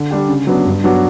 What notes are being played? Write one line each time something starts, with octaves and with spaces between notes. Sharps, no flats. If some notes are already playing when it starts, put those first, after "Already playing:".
Already playing: D3
G3 D4 G4
C#3
F#3 B3 D4
G2
F#3 B3 D4 F#4